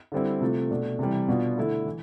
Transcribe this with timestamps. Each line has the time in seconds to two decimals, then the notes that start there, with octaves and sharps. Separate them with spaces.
0.12 D3 G3 C4 E4
0.41 C3 F3 A3
0.71 B2 A3 D4
0.99 C3 E3 G3
1.28 B2 B3 D4 F4
1.57 D3 A3 E4
1.86 E3